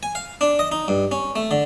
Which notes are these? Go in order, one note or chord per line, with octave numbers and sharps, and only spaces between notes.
G#5
F5
D4
D#5
D#4
G2
C#4
A3
D3